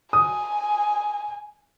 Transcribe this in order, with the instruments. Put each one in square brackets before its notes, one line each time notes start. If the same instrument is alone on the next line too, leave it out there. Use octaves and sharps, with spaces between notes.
[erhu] G#5 [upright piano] D#6